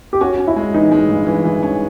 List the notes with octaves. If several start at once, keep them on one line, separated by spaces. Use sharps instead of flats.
G4
C#4 F#4
C#4
E4
G#3
E3 D#4
G#3
G2
E3
E3
C#4